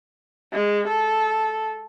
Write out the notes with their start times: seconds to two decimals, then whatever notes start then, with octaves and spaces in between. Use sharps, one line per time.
0.53 G#3
0.88 A4